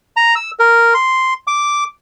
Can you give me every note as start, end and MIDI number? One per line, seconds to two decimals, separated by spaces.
0.17 0.35 82
0.36 0.51 88
0.59 0.94 70
0.94 1.34 84
1.47 1.84 86